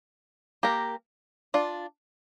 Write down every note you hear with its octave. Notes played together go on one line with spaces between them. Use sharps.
A#3 G4 A#4
D4 F4 D5